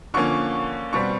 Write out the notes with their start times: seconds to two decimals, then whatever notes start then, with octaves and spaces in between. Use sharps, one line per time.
0.14 D3 F3 A#3 C#4 C#6
0.93 B2 G3 C4 C#6